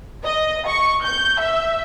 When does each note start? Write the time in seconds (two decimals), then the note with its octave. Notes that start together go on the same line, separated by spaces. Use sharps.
0.24 D#5
0.68 C#6
1.04 G6
1.40 E5